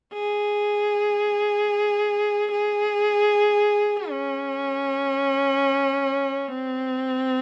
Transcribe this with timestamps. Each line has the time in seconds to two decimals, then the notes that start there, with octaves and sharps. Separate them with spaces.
0.13 G#4
2.52 G#4
4.10 C#4
6.48 C4